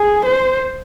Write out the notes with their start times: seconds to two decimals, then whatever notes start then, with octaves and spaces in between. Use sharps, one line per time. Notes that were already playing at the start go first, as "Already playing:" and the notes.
Already playing: G#4
0.26 C5